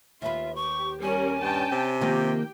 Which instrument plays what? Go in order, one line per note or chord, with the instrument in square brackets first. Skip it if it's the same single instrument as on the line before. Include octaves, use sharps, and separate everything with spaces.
[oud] D#2 B4 [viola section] F4 [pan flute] E5
[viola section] G4 [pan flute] C#6
[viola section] G3 C#4 A#4 [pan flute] G#5
[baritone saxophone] G2 [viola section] C#4 G5 A5
[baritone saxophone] C3
[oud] D#3 F3 A#3 [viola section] G4 G5